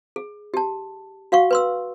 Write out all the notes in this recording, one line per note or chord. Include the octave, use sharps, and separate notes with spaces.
G#4
G4 A5
F#4 F5 F#5 C#6
B4 C6 E6